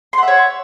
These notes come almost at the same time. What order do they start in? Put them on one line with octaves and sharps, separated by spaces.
C6 F#5 E5 C#5